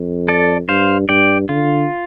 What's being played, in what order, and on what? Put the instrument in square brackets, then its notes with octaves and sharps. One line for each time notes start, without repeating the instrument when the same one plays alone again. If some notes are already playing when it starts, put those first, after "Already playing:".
Already playing: [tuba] F2
[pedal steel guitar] A4 D5
[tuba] G2 [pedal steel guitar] C5 F5
[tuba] G2 [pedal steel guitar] D5 G5
[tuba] D3 [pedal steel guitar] F4